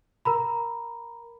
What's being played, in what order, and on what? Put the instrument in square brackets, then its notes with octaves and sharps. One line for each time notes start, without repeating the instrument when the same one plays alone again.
[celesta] A#4 A#5 B5